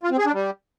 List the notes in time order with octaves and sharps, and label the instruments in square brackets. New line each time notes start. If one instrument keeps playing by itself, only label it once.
[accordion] F4
C4
G#4
D4
G3